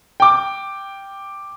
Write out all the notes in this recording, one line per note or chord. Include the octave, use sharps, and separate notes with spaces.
G5 D6